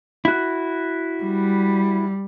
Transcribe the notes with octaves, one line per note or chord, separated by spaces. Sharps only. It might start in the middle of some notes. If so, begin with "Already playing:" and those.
E4 F#4
G3